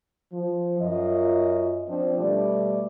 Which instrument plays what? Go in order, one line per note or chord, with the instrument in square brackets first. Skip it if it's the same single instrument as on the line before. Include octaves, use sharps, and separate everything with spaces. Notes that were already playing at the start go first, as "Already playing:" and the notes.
[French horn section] F3
F#2 F4 D#5
F3 C4 D4
B2 G3 A3 D5